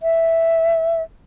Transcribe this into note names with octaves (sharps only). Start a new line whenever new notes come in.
E5